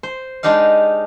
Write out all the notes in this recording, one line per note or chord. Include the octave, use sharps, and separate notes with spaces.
C5
G#3 D4 D#4 G4 F5